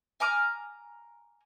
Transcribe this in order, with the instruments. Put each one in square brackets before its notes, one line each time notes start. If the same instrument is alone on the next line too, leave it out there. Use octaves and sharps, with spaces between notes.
[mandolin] G#5 A#5 D6 F6